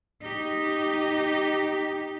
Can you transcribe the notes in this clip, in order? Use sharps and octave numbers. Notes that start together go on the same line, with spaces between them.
D#4 G4